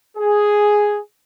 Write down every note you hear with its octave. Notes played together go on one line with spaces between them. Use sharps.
G#4